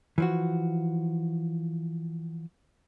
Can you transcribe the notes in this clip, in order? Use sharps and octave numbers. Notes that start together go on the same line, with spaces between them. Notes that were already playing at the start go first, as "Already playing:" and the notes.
E3 F3 F#4